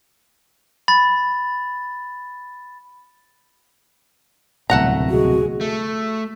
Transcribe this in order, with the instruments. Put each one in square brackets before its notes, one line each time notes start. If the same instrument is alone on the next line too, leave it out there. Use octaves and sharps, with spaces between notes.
[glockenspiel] B5 A6
[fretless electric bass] D1 C2 B2 [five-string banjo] A3 F#5 A#5
[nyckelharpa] G#3 G#4 [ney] F#4
[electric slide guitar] A3